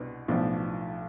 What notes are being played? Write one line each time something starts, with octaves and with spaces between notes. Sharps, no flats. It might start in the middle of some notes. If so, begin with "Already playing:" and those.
Already playing: C2 B2 B3 D4
B1 A2 F3 B3 D4